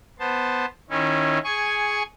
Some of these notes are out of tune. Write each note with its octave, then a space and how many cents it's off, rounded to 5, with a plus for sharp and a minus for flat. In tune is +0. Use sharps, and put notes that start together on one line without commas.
B3 +0 C5 +0 A5 +0
D#3 +0 C#4 -15 E4 +10
G#4 +10 G#5 +0 C#6 +0